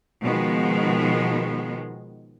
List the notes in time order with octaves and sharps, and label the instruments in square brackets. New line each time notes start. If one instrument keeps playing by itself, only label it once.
[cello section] B2 D#3 F3 G#3 B3